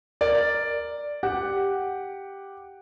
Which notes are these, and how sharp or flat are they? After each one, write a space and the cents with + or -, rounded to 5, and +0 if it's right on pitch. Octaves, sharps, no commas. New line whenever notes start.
A#4 +0 D5 +0
G4 +0 F#5 +0